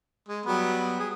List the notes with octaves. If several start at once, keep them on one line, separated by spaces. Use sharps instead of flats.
G#3
F#3 G3 B3
G#4